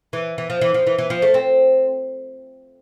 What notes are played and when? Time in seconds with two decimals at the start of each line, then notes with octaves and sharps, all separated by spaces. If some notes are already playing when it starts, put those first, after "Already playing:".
0.13 E3
0.38 E3
0.50 F3
0.61 E3
0.74 F3
0.87 E3
0.98 E3
1.10 F3
1.22 A3
1.34 C4